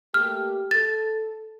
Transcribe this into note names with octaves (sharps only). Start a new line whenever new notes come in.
A3 A#3 G4 F6
A4 A6